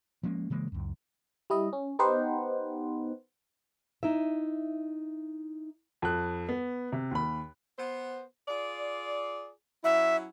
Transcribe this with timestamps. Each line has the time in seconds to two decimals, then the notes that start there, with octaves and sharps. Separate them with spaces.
0.23 F3 G#3 A#3 C#4
0.50 C#3 E3 G#3 A#3
0.72 C#2 F#2
1.50 G3 E4 D#5
1.73 C#4
1.99 B3 D#4 G4 B4 C5 F#5
4.03 D#4 E4 E5
6.02 F2 F#6
6.49 B3
6.92 C3
7.11 D#2 B5
7.79 B3 C5
8.48 F4 G#4 D5
9.84 F#3 C#4 E4 E5